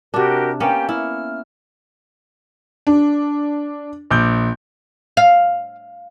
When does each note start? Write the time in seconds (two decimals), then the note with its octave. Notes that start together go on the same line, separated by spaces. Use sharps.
0.14 C3 D4 F#4 G4 A#4
0.60 A#3 B3 C#4 G4 G5
0.89 E4 F6
2.87 D4
4.11 A#1 D6 G6
5.17 F5